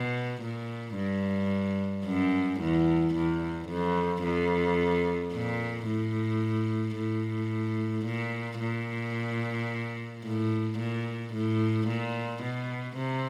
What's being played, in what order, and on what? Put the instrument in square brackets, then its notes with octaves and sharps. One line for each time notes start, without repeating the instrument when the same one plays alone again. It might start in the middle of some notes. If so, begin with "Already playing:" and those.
Already playing: [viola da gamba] B2
A#2
G2
F#2
E2
E2
F2
F2
A#2
A2
A2
A#2
A#2
A2
A#2
A2
A#2
B2
C3